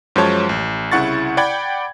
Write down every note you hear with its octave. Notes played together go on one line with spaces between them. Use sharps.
F#2 F3 G#3 C5 C#5 A5
A1
C2 C#3 E4 F#5 C#6 A6
D5 F#5 G5 B5 G#6